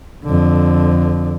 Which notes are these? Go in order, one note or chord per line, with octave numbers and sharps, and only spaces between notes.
F2 D3